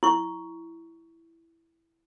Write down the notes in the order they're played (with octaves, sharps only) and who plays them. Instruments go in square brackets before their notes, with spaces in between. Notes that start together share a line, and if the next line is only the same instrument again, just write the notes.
[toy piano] E4 C#6